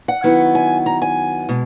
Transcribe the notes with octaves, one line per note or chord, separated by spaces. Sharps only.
F#5
D#3 F#3 B3 E4
G#5
A#5
G#5
B2 G#3